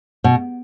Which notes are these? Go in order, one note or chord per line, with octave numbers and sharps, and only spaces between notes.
B2